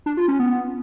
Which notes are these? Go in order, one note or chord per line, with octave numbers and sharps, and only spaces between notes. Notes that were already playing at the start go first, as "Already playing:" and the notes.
D4
F4
C#4
B3